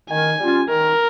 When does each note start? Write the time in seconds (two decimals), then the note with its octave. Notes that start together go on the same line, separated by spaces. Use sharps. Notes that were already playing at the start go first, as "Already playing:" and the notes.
0.10 D#3 G#5
0.39 G3 C#4 F4
0.70 D#3 A#4